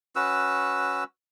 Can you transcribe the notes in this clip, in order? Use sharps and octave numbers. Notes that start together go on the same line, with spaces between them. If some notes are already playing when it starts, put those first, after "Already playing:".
C#4 F#4 B4 E6